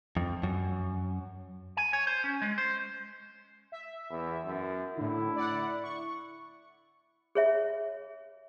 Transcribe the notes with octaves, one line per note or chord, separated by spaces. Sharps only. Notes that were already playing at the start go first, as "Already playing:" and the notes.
F2
F#2
G#5
C#5
C5
C#4
G#3
C5
E5
E2
F#2
A2 D3 E4
D5 F#5
C#6
G#4 C#5 E5